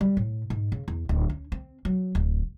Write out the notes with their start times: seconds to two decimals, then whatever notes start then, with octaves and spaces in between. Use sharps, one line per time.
0.01 G3
0.17 A2
0.50 G#2
0.72 C#3
0.88 E2
1.09 D1
1.30 C#4
1.52 C4
1.85 F#3
2.15 D1